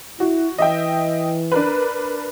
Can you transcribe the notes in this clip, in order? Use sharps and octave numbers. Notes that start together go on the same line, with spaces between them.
E4 F#4
E3 D#5 E5 G5
D4 A#4 B4